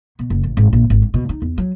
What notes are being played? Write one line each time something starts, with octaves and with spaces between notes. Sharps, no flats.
B2
F#1
A1
G#1
A#1
G#1
G2
B2
D#4
E2
F#3